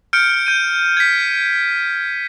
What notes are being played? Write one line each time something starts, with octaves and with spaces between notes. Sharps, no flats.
F6 G6 C#7 D7
G6 D#7
G#6 B6